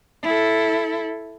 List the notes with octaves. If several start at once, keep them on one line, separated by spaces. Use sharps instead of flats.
E4 A4